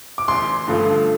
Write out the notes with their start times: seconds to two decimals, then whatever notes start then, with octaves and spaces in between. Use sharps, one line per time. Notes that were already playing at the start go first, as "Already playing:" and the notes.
0.18 D6
0.28 A1 C6
0.68 G2 D3 F3 A3